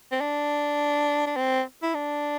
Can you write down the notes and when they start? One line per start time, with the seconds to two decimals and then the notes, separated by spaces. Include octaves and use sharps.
0.11 C4
0.21 D4
1.27 D4
1.36 C4
1.83 E4
1.95 D4